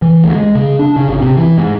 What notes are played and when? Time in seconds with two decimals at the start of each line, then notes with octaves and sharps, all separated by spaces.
0.02 E3
0.24 D2
0.35 G#3
0.55 C#3
0.79 D4
0.96 C#3
1.09 G#1
1.21 C3
1.37 E3
1.58 G#2